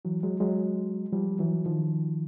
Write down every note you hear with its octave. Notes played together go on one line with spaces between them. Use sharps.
E3 F#3
F#3 G#3
F#3 G#3
F3 G3
E3 F#3
D#3 F3